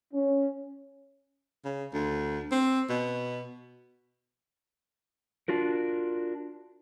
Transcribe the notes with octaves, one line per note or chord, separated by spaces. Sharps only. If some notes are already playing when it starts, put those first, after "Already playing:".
C#4
C#3
D2
C4
B2
D4 F4 F#4 A#4